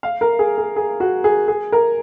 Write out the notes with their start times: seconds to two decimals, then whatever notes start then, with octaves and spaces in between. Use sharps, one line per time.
0.03 F5
0.21 A#4
0.39 G#4
0.58 G#4
0.76 G#4
1.00 F#4
1.24 G#4
1.48 G#4
1.72 A#4